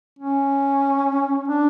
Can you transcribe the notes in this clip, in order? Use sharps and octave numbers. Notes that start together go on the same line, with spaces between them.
C#4
D4